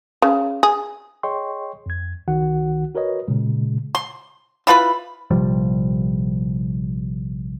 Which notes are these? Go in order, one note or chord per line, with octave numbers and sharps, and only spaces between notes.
C#3
G#4
G#4 C#5 D#5 G5 C6 C#6
F2 G#6
C2 D#3 F#4 F#5
F#4 A#4 B4 C#5 D#5
A#2 C#3 G#3
C6
E4 F4 B4 B5
A#1 C3 F3 G3